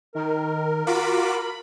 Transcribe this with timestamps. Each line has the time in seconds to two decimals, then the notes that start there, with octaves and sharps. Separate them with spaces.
0.15 D#3 A#4
0.87 F4 F#4 B5 D6